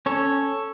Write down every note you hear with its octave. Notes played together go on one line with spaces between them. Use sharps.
C#4 A4 C#5